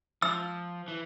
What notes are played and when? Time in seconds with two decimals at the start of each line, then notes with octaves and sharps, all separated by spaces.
0.22 F3 E6
0.88 E3